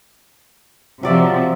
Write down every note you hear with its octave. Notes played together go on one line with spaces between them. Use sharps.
C3 F3 F#3 D5 E5